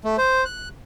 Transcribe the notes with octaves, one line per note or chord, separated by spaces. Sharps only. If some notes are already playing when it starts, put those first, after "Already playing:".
A3
C5
F#6